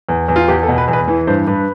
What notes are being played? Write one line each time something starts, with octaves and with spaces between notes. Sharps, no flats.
E2
E2
F4
E2 G4
A4
B2
B4
E2
B4
E3
G2 C5
G2 B4